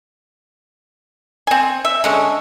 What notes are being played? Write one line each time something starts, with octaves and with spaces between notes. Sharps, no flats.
C4 G#5
E5
D3 G#3 C#4